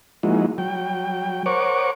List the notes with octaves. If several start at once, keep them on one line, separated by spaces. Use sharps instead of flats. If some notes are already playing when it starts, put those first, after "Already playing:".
F3 G#3 A#3 D#4 E4 F#4
F#3 G5
A#4 C5 C#5 F#5 C#6 D6